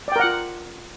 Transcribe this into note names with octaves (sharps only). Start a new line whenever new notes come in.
F4 A#4 D5 F#5 G5